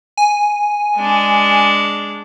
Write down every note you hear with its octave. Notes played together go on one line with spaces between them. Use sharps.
G#5
G#3 D4